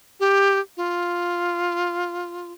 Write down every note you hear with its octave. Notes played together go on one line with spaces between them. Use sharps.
G4
F4